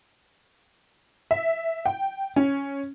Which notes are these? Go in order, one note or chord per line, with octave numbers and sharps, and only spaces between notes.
E5
G5
C#4